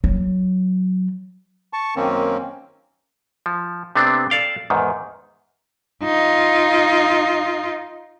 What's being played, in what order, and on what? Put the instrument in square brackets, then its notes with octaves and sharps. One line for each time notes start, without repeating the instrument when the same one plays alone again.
[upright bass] F#3
[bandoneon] A5 C#6
F#2 D#3 A#3 C4 C#4
[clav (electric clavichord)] F3
C3 A3 B3 C4 D4
A4 D5 F5 G5
E2 G#2 D#3
[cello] D#4 F4